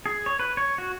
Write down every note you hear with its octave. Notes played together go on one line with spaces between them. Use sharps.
G#4
C#5
B4
C#5
F#4